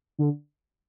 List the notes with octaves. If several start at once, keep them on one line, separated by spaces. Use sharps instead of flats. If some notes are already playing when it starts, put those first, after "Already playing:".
D3